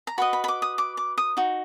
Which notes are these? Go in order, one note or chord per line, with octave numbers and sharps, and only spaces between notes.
A#5
F#4 B4 D#5 B5
B5
B5
D6
D#6
D6
D6
D#6
D#4 F#4